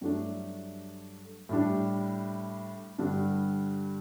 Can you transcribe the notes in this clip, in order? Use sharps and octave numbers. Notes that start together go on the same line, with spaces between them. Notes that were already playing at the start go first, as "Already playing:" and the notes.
G2 F#3 A3 D4
A2 G3 D4
G2 D3 G3 D4